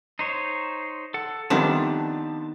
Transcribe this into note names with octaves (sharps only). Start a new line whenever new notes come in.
D#4 C5 C#5
A4 F#5
F2 C3 D#3 G3 B3 D4 A5